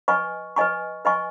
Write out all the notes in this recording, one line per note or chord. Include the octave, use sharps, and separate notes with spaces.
B4 D#5 G#5 C#6
B4 D#5 G#5 C#6
B4 D#5 G#5 C#6